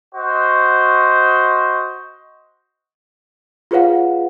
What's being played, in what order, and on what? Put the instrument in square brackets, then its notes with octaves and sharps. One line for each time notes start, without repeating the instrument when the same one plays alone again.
[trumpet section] F#4 C5 D#5
[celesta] F4 G#4 B4 C#5 F5 F#5